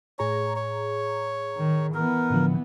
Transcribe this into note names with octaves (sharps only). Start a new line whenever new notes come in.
A2 G#4 C#5 A#5
C#5
D#3
E3 B3 A#4
A2 D3 F3